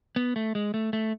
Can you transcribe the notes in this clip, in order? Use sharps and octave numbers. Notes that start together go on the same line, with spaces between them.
B3
A3
G#3
A3
A3